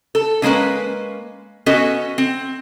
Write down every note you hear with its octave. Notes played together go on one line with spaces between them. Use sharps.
A4
D3 G#3 A#3 C#4 B4
B3 C#4 F#4 A4 D#5
C4